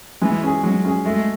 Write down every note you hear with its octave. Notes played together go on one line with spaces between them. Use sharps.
E3 G#3
C#4 G#4
F#3 G#3
C#4 G#4
G#3 A3